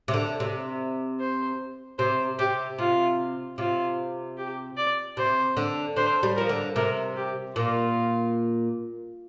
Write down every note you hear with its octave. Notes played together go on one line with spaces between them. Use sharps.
C3
D3
C3
C5
C3 C5
C3 G4
C3 F4
C3 F4
G4
D5
C3 C5
D3
D3 C5
G3
F3 A#4
D3
C3 A#4
G4
A#2 F4